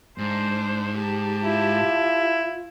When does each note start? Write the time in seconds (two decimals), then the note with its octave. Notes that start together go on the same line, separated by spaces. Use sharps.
0.18 G#2 D4 C5
0.97 G4 A5
1.44 E4 F4